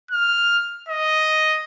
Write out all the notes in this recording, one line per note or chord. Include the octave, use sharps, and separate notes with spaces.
F6
D#5